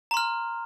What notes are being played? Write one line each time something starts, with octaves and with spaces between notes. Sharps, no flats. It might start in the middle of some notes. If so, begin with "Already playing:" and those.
A#5 C6 F6